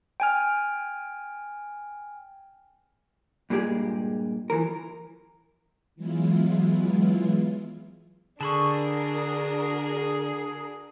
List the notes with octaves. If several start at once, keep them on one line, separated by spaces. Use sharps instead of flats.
G5 G#5 F6
G2 A#2 G#3 G4 G#4
E3 F3 A#4
E3 F#3 G#3 B3 E4 F4
D3 D4 F#4 G#4 A#4 A5 B5 C#6